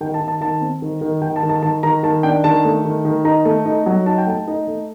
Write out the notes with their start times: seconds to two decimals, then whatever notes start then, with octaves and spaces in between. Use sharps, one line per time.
0.01 D#3 G5
0.14 A5
0.20 D#3
0.28 A5
0.41 D#3 A5
0.61 C4
0.82 D#3
1.01 D#3
1.22 D#3 G5
1.36 A5
1.43 D#3
1.49 A5
1.62 D#3 A5
1.83 D#3 A#5
2.03 D#3 A5
2.23 D4 G5
2.44 D#3 A5
2.65 A3
2.85 D#3
3.05 D#3
3.25 D#4 A#5
3.45 A3
3.65 D#4
3.86 F#3
4.06 D#4 A5
4.18 G5
4.27 A3 A5
4.48 D#4
4.67 A3